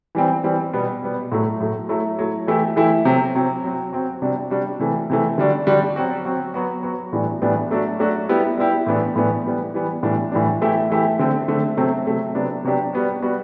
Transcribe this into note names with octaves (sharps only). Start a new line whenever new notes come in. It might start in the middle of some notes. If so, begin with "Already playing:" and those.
E3 G3 C4
E3 G3 C4
B2 G3 B3
B2 G3 B3
A2 F#3 A3
A2 F#3 A3
F#3 A3 E4
F#3 A3 E4
E3 A3 E4 G4
E3 A3 E4 G4
C3 F#3 C4
C3 F#3 C4
F#3 C4 F#4
F#3 C4 F#4
C3 G3 D4 F#4
C3 G3 D4 F#4
C3 E3 A3
C3 E3 A3
D3 G3 D4 F#4
D3 G3 D4 F#4
F#3 C4 F#4
F#3 C4 F#4
F#3 B3 F#4
F#3 B3 F#4
A2 E3 G3 B3 D4
A2 E3 G3 B3 D4
F#3 A3 D4 F#4
F#3 A3 D4 F#4
G3 B3 E4 G4
G3 B3 E4 G4
A2 E3 B3 D4
A2 E3 B3 D4
E3 G3 B3
E3 G3 B3
A2 E3 G3 D4
A2 E3 G3 D4
E3 A3 E4 G4
E3 A3 E4 G4
D3 A3 C4
D3 A3 C4
C3 F#3 A3 C4
C3 F#3 A3 C4
C3 F#3 B3 D4 G4
C3 F#3 B3 D4 G4
G3 B3 F#4
G3 B3 F#4